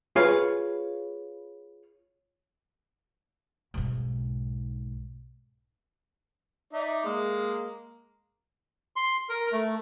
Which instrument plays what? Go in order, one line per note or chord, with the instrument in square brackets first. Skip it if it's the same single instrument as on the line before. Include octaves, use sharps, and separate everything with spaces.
[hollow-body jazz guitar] F4 G#4 B4 C#5 F5
[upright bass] B1 G#2
[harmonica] D#4 D5 E5
G#3 A#3
[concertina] C6
A#4
A3